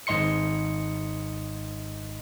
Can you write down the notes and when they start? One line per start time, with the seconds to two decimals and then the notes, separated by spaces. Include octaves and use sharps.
0.07 G#1 G#2 D#5 C6 C#7